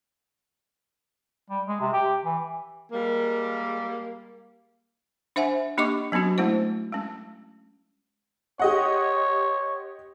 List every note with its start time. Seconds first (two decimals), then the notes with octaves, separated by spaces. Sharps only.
1.50 G3
1.68 G#3
1.81 C3
1.93 G4
2.25 E3
2.92 G3 G#3 A#3
5.36 D4 C5 E5 F#5 G#5
5.78 A#3 D4 G4 D#5 C#6 D6
6.12 F#3 B3 C#4 D4 F#4
6.38 G#3 A3 C#4 E4 C5
6.92 G#3 C#4
8.59 G4 C#5 D#5 F#5